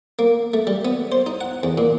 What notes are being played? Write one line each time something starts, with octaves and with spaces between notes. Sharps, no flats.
A#3
A3
G3
B3
C5
D#4
F#5
E2
A#2